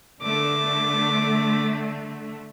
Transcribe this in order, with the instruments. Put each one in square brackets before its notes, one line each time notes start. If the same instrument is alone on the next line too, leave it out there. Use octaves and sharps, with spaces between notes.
[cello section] D3 A3 [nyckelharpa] D6